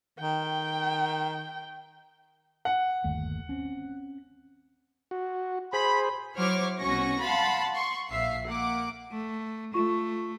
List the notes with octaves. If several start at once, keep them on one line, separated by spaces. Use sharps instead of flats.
D#3 G5
F#5
G1 D#2 A3
C4 C#4
F#4
G#4 C5 B5
F#3 E4 C5 C#5 D6 F6
C2 B2 C#4 F#4 C#6 A#6
F5 F#5 A5 B5 C6 A6
C6 C#6
A#1 E5 F5 C7
A#3 F#5 D6
A3
A3 F4 C#6